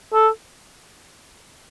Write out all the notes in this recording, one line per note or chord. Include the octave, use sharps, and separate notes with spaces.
A4